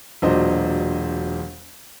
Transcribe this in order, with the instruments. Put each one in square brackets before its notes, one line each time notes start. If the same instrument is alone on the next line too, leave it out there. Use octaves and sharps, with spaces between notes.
[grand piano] E1 A#2 F#3 D4 C5 D#5